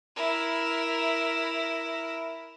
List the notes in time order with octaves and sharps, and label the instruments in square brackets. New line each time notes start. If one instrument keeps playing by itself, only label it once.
[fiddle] E4 A#4